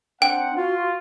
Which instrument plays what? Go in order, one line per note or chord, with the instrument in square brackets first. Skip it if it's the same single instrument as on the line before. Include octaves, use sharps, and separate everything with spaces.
[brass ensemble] C4 F#5 [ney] D4 [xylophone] G5
[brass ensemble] F4 [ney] F#4